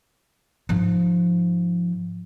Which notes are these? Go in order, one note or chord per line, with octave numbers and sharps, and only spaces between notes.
G#2 F3